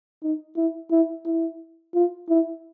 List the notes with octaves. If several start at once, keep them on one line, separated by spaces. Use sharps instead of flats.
D#4
E4
E4
E4
F4
E4